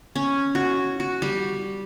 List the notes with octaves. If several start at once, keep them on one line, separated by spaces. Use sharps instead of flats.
C#4
F#4
F#4
G3